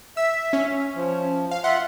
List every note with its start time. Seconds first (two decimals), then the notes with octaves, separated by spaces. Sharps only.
0.17 E5 E6
0.53 C#4
0.96 F3
1.51 F5
1.64 F4 E5 F#5 C6